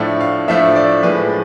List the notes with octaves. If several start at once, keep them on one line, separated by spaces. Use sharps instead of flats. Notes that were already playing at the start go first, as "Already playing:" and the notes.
Already playing: A2 F3 A3 D4
F5
A2 F3 A3 D4 E5
D5
A2 F3 G#3 B4